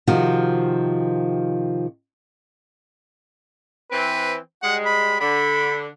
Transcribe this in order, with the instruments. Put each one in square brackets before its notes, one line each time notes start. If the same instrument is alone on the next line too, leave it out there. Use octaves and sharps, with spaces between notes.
[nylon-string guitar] C3 D#3 F3 F#4
[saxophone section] E3 C4 [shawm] B4
[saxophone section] G#2 G3 G#3 [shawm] F#5
[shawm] B5
[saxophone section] D3 [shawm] B5